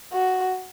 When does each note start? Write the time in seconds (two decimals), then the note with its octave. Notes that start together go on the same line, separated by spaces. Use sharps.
0.13 F#4